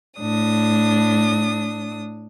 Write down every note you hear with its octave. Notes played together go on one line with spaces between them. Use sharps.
A2 D4 D#6